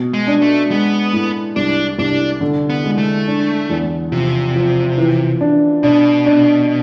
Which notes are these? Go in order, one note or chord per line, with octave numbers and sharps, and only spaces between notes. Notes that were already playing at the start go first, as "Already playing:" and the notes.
Already playing: B2
G#3
D4
A3
G#3 B3
A2
C2 D4
C2 D4
D3
B3
G#3
A3
D4
E2
C3 F3
F3
E3
D4
B2 D4
D4